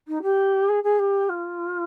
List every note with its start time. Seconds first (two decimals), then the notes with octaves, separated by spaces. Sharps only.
0.08 D#4
0.23 G4
0.69 G#4
0.84 G#4
0.99 G4
1.29 F4